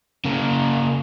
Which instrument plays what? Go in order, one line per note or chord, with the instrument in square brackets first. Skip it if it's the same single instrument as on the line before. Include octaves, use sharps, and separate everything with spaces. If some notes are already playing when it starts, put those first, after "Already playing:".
[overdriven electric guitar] C#3 A#3